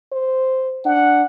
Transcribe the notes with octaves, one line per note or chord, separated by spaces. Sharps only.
C5
D4 F#5